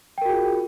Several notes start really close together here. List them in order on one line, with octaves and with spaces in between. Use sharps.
G5 A#4 F#4 G#4 F4